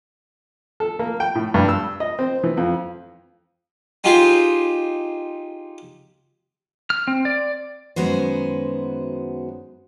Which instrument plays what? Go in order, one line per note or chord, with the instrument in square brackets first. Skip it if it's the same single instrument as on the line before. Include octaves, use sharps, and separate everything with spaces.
[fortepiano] A4
A#3
G5
A2
G2
E6
D#5
C4
E3
F2
[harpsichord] D#4 F4 G4 G#4 C5
[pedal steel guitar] F6
C4
D5
[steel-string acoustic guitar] F#2 D#3 G#3 B3 F#4 C5